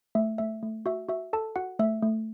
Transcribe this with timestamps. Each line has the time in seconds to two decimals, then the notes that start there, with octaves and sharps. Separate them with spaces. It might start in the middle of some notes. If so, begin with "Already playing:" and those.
0.15 A3 E5
0.38 A3 E5
0.63 A3
0.86 F#4 E5
1.09 F#4 E5
1.33 A4 A5
1.56 F#4 F#5
1.79 A3 E5
2.03 A3